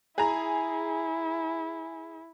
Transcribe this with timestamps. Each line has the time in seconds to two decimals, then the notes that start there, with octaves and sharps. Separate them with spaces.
0.18 E4 G#4 A#5